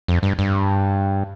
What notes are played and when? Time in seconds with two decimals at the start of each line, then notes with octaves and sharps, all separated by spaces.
0.08 F2
0.23 G2
0.39 G2